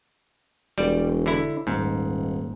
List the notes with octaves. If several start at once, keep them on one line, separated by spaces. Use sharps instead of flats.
E1 G3 D5
D3 E4
D#1 G#2